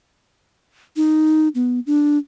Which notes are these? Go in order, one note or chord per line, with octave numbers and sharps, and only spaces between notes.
D#4
B3
D4